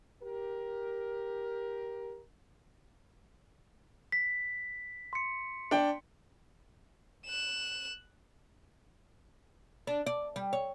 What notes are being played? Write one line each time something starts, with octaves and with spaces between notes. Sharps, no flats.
G4 A#4
B6
C6 C#7
D4 G5
F#6 E7
D4
D5
G3
C#5